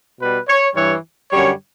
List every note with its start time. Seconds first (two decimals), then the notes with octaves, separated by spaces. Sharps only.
0.18 B2 G3 B4
0.47 C#5
0.75 G2 E3 G3 C#5
1.32 F#2 D3 G3 C#5